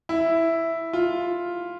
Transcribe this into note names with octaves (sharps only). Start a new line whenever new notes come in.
E4
F4